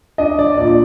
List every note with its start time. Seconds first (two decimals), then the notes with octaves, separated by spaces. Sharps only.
0.18 D4 D#5
0.39 D5
0.58 A#2 D5